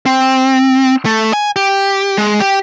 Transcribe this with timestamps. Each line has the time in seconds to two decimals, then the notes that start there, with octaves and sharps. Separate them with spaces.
0.06 C4
1.05 A3
1.33 G#5
1.56 G4
2.18 G#3
2.40 G4